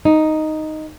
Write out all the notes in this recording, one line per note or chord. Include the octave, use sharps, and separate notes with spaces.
D#4